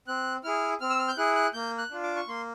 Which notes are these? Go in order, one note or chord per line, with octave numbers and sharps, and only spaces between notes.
C4 F#6
E4 G#4 F6
C4 F6
E6
F6
G6
E4 G#4 F#6
F#6
A#3 G6
F#6
D4 F4
D6
C#6
A#3 C6